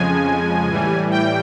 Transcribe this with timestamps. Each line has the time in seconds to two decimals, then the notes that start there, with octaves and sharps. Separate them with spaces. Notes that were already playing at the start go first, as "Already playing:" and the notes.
Already playing: F2 C#3 F3 G#3 G#5
0.69 A2 E3 G3
1.11 G5